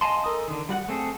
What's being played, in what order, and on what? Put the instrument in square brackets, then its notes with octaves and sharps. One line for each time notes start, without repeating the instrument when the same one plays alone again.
[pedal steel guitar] D#5 F5 G#5 A5 C6
A4 A#4 D#6
D3 D#3
G3 F#4 F#5
A3 C4 G#4 A4